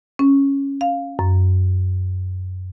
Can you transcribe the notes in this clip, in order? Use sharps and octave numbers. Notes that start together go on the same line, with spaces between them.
C#4
F5
F#2